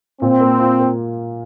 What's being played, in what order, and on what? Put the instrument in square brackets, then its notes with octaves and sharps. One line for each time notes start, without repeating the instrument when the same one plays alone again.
[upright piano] A#2 [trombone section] C4
[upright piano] A#3
F4
A#3